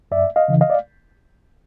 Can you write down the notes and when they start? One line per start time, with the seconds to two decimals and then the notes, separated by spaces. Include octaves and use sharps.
0.11 F#2 D5 E5
0.36 D#5 F5
0.48 C#3 E3
0.61 D#5 F5
0.70 D5